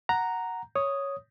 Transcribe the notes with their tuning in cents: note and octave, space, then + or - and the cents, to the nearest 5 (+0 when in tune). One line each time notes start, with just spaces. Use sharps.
F#5 +0 A#5 +0
C#5 +0 D#6 +0